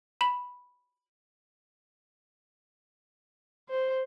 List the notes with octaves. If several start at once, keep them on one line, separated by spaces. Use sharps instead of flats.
B5 B6 F#7
C5